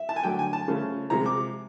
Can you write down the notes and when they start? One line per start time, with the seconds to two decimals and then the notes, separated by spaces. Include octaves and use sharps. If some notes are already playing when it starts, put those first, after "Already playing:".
Already playing: E5
0.09 A5
0.16 G#5
0.23 D3 F#3 A3 G5
0.39 G#5
0.53 A5
0.68 C#3 F3 A3
1.10 C3 F3 G#3 A#5
1.26 D6